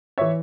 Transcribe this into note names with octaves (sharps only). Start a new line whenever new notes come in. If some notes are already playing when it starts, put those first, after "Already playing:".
E3 C#5 E5